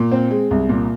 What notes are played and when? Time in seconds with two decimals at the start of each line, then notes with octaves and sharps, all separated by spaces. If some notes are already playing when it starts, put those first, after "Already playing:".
Already playing: A#2
0.12 C4
0.31 G#3
0.51 C2
0.69 A#2